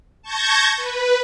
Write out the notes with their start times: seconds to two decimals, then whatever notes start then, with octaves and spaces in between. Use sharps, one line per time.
0.22 A5 C#6 G6 G#6 A#6
0.77 B4